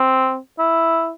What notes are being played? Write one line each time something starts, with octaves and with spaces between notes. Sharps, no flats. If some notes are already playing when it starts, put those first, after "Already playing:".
Already playing: C4
E4